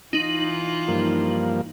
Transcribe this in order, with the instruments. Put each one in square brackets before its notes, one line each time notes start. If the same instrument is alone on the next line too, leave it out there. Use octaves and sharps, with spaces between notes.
[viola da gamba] E3 F4 [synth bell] D#4 F#7
[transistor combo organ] G2 F3 A#3